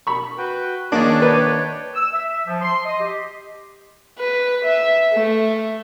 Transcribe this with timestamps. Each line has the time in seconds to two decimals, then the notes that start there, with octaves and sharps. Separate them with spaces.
0.07 B5 C#6
0.38 F#4 B4 G5
0.92 D#3 A#3 C#4 D4 G#4 C#5
1.22 B4 C#5 G5
1.95 E6
2.14 E5
2.47 F3
2.62 C6
2.84 D#5
3.00 G4
4.19 B4
4.65 E5
5.13 A3